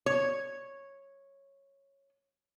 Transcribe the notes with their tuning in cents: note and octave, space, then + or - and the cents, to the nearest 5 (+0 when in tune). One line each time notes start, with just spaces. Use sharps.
C#5 -10